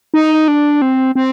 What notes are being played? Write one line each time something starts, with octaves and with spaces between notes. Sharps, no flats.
D#4
D4
C4
C4